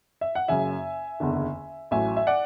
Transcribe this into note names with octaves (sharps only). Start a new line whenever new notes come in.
E5
F#5
F#1 F#2 C#3 E5 G#5
F#1 E2 D3
A1 A2 F#3 E5 G#5
E5
D5 F#5